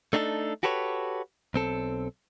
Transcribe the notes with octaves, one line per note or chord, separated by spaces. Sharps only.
A3 D4 D#4 G4 A4
F#4 G4 A4 B4 C#5
B1 C4 A4